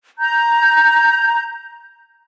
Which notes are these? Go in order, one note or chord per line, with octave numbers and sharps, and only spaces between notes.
A#5 G6